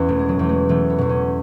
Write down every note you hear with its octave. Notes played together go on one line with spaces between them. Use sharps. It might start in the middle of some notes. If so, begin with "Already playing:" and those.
Already playing: E2 B3 C#4
E1 A3
G#3
F#3
E2 B2 A3
G#3
E1 A3
B3
E2 B2
C#4